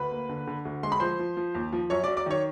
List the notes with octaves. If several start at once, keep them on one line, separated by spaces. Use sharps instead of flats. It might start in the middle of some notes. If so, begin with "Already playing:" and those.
Already playing: D2 B4 B5
A#3
D3
D3
D2
G#3 C6
B5
F3 C5 C6
F3
F3
D#2
F3
F#2 C#5 C#6
D5 D6
F#3
D5 D6
D#3 C#5 C#6